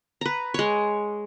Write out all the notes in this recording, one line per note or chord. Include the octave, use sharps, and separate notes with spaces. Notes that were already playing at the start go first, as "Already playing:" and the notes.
B4 A#5
G#3 C#5